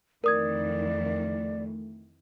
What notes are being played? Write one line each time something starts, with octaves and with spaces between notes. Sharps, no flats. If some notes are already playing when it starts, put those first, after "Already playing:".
F2 D#3 E3 A3 A#4 D5 D#6 G#6